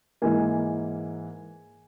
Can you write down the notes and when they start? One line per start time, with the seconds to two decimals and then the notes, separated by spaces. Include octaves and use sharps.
0.22 G#2 E3 A#3 G#5